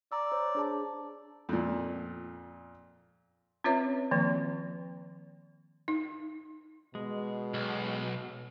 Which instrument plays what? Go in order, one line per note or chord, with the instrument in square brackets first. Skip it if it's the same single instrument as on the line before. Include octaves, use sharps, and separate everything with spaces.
[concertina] D5 [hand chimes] A#5 E6
[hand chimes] C5 C#5
D4 G#4 A5
[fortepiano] F2 A#2
[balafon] C4 C#4 F4 B4 C#5 E5
D#3 F3 A#3 C4
D#4
[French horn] B2 [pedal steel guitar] G#3
[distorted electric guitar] B1